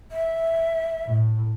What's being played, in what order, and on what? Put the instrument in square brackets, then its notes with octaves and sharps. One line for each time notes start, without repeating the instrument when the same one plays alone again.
[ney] E5
[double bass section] A2